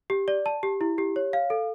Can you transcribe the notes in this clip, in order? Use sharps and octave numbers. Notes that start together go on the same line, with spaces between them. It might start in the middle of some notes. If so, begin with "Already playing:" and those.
G4
D5
A5
G4
E4
G4
C#5
F5
A4